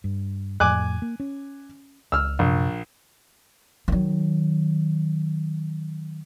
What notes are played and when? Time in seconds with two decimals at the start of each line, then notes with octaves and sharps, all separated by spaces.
0.04 G2
0.60 F2 A2 G#5 D6 F#6
1.02 A#3
1.20 C#4
2.12 C#2 E6 F6
2.39 A#1 F#2 C3
3.88 D#3 F#3